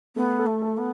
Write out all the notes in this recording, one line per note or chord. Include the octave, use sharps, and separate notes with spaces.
A3 B3
A4
A3
A4
B3